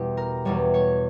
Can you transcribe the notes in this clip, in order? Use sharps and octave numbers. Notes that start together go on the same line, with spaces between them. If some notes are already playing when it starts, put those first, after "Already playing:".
Already playing: E2 B2 G3 E4 G4
A#4
E2 B2 G3 C#5
C#5